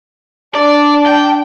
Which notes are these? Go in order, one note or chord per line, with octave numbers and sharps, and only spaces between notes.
D4 D5
G5